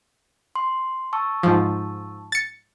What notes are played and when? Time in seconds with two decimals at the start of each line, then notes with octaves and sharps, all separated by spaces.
0.55 C6
1.13 A5 C#6 E6
1.43 G#2 F3
2.32 A6 C#7